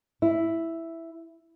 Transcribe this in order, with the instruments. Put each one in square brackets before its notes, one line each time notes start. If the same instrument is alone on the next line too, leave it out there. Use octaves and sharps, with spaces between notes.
[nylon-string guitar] E4